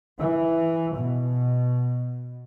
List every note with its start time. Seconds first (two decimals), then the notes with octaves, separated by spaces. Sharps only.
0.19 E3
0.94 B2